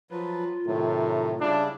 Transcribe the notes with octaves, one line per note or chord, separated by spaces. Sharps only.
F3 F#3 F4 B4
A2 C3 D#3 F#3
C#3 G3 D4 E4